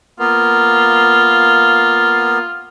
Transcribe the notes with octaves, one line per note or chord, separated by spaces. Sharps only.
A#3 B3 F4